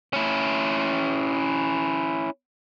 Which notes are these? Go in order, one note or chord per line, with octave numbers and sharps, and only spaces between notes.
C#4 E4